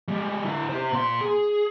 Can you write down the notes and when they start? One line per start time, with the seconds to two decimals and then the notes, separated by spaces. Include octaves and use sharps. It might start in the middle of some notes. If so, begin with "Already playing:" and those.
0.08 G3 G#3
0.44 D3 E4
0.69 G4 C5
0.92 A#2 C6
1.21 G#4